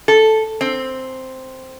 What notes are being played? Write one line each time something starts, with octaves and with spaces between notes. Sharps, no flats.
A4
C4